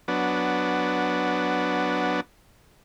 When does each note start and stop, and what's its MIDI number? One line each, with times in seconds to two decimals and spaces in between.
0.08 2.21 54
0.08 2.21 59
0.08 2.21 62